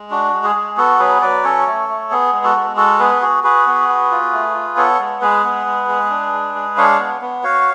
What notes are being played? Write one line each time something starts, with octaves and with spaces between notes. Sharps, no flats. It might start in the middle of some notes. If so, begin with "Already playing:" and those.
Already playing: G#3
D4 F#4
G#3
G#4
G#3
B3 F#4 A4
F#3 G#4 B4
F#3 B4 D5
C#4 A4 C#5
A3
A3
B3 G#4
G#3
F#4 A4
G#3
F#4 A4
B3 G#4 B4
F#4 G#4
F#4 G#4 B4
B3
F#4
F4
A3
F4
B3 A4 C#5
G#3
G#3 G#4 B4
B3
G#3
G#3
D4
G#3
G#3
D4 C#5 F5
B3
B3
F#4 C#5 F5